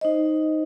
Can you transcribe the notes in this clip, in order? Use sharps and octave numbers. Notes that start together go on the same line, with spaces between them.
D#4 C5 D#5